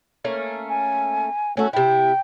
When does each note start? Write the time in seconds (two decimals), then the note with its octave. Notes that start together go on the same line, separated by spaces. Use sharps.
0.24 A3 A#3 C#4
0.69 G#5
1.57 A3 C#4 F#4
1.73 C3 E4 G5